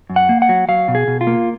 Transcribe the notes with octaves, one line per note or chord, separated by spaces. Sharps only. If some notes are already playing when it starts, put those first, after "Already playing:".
F#2
F#5
A#3
F#5
F#3
F#3 F5
B2
G#4
B2
F4
A#3